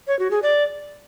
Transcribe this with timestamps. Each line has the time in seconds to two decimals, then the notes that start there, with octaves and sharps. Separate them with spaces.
0.08 C#5
0.19 F#4
0.31 G#4
0.43 D5